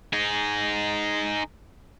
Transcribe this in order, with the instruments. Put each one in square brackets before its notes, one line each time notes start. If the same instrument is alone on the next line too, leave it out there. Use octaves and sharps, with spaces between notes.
[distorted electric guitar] D#4 G#4